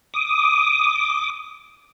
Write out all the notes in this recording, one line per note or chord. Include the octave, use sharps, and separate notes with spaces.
D6 D#6